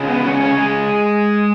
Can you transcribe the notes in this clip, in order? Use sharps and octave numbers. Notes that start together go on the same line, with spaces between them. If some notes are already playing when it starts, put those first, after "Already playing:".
Already playing: C#3 G#3
B3 B4
C#4 C#5
C#4 C#5
G#3 G#4